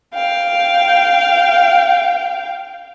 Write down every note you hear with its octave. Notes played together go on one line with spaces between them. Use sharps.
F5 G5